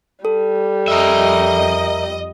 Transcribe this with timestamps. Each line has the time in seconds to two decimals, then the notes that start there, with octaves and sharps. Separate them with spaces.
0.25 G3 A4
0.88 F2 A#4 D#5 E5